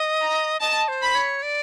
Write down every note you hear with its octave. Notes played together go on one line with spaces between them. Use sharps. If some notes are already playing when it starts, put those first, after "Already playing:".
Already playing: D#5
A#5
D#5 A5
C5
B5
C#5
D5